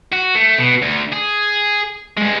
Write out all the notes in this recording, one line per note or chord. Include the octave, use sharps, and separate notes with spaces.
F#4
A3
B2
D2
G#4
G2 G#3